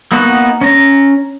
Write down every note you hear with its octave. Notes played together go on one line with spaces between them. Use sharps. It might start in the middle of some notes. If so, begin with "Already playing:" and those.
A#3 B3 D#4 F#4
C#4 A#5